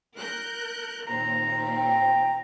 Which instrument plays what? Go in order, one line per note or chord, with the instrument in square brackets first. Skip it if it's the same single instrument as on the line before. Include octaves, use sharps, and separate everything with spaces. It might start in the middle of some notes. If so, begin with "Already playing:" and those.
[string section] A#4 F#6 G6
[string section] D#2 A#2 C4 [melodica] A#5
[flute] G5